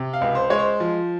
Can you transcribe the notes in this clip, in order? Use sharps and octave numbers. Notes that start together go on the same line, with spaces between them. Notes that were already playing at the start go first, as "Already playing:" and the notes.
Already playing: C3
F5
C#2
C5
G#3 C#5
C5
F3